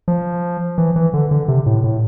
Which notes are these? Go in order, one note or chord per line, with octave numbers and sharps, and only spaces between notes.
F3
E3
E3
D3
D3
C3
A2
A2